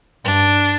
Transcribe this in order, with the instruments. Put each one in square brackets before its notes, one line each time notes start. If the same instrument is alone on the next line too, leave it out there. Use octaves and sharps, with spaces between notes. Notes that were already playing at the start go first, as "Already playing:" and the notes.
[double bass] G2 [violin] D4